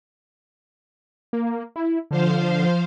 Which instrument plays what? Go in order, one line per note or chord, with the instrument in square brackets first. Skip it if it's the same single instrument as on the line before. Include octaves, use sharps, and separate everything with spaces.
[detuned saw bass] A#3
E4
[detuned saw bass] D3 [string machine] F3 C5 F5